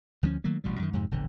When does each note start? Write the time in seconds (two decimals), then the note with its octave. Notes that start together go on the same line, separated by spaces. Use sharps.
0.23 D2 F3 G3 C#4
0.44 D#3 F#3 A3 A#3
0.64 A1 B2 G3
0.79 F#2 D#3
0.93 F2 G#2 C3
1.11 E1 A#1 D3